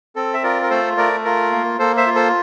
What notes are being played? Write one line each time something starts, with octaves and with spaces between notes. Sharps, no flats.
C4 A4
E5
F4 A#4 D5
A#4
A3 A4 C5
A3 A#4 D5
F4 A#4
A#3
A#3 A4 C5
C5 E5
F4
A4 C5